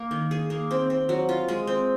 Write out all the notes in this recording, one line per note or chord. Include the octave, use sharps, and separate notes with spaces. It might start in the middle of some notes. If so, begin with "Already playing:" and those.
Already playing: A#3
D#3
G#4
A#3
C4
C4
F#3
F4
G#3
C4